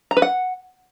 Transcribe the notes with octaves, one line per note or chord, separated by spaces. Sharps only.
A#5
B4
F#5